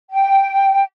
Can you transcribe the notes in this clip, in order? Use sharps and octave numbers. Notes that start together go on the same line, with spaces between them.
G5